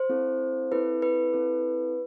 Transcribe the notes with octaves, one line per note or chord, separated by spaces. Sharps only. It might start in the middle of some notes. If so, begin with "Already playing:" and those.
Already playing: C5
C4 E4 A4
C4 E4 A4 B4
B4
C4 E4 A4